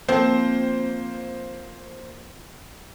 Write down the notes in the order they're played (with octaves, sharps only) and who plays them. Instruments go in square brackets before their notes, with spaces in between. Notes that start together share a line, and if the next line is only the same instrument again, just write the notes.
[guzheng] F3 C4 [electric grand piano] A#3 C5